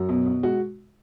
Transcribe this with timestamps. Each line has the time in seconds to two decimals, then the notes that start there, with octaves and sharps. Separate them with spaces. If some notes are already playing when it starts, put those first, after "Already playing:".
Already playing: F#2 F#4
0.09 B2
0.26 B2
0.43 G#3 F#4